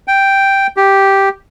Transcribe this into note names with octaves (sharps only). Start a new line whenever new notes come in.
G5
G4